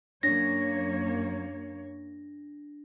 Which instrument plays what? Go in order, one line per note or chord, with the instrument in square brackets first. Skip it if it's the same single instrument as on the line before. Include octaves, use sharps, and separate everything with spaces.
[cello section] F#2 A#3 C#5 [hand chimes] D4 A#6